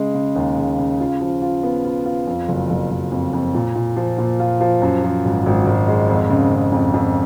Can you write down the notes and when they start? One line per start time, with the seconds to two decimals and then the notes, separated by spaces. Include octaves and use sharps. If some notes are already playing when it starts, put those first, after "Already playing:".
Already playing: C#3 G#3
0.14 C#3
0.36 D#2
0.57 C#3
0.79 C#3
1.00 F4
1.21 F3
1.42 F4
1.63 B3
1.85 F4
2.05 F4
2.27 F2
2.48 F#1
2.70 F#1
2.91 F#1
3.12 F2
3.33 F2
3.55 A#2
3.75 A#2
3.97 F3
4.18 A#2
4.40 F4
4.61 F3
4.82 F#2
5.04 F3
5.25 G#1
5.46 G#1
5.67 G#1
5.88 G#3
6.09 F2
6.30 C#3
6.52 C#3
6.72 F2
6.94 F2